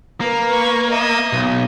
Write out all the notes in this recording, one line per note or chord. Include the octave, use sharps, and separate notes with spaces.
A#3 A#4 B4
B4 C#6
D#5 E5
B1